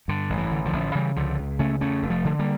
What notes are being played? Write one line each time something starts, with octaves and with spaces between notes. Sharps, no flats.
G2 D3
A1
E3
D3
D3 F3
A1
C#3 E3 G3
C#2 D3 F3
C#2
C#3 A3 C#4
E2 A3 C#4
F1
F3 A3
D3
G3 A#3